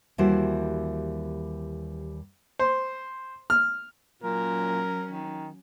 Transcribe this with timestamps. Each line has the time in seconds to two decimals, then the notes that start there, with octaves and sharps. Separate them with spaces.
0.18 D#2 E3 G3 E4 F#4 C5
2.59 C5
3.50 F6
4.23 A#2 F#3 C#4 A#4
5.11 D#3